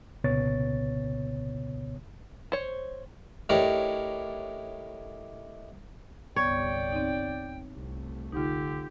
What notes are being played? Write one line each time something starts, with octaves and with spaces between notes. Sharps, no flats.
C2 A#2 C#3 B3 C#5 A6
C5 C#5
A2 D4 D#4 G4 A#4 C#5
G1 C2 B3 C#5 D5 G5
C4 D#4
C2 A3
D3 D#4 F4 G4